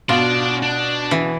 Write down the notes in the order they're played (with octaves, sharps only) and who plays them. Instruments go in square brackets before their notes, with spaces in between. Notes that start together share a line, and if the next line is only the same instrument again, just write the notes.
[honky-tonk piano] B2 [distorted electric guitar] D4 D5 [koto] F4
[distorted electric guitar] D4
[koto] E3